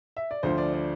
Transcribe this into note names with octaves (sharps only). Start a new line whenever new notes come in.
E5
D5
D2 D3 F3 C5
D5
D5